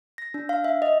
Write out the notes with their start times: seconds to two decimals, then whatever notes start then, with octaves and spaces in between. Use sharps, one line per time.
0.18 A#6
0.34 D4
0.49 F5
0.64 E5
0.82 D#5